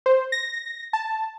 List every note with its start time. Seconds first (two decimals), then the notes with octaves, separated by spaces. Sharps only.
0.06 C5
0.32 A#6
0.93 A5